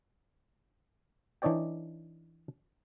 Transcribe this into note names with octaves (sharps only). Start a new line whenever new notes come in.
E3 D4 D#4 C#5 D5 G5